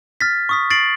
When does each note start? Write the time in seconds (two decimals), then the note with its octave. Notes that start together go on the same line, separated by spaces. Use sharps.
0.21 F6 A6 B6
0.49 C#6 D#6 B6
0.70 A6 C7 D7 F#7